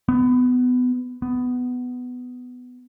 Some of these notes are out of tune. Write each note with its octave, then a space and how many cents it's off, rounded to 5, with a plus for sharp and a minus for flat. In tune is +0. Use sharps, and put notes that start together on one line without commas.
B3 +20
B3 +10